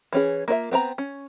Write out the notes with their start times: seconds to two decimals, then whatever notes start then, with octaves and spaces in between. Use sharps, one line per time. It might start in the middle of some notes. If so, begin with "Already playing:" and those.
0.13 E3 C#4 G#4
0.48 A#3 F4 C#5 E5
0.71 B3 C4 C#5 A#5
0.98 C#4